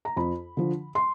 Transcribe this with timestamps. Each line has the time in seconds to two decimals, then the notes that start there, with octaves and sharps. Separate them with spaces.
0.05 A#5
0.16 F2 B5
0.57 D3 F3
0.95 C6